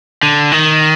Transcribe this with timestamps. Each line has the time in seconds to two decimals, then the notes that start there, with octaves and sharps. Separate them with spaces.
0.23 D3
0.52 D#3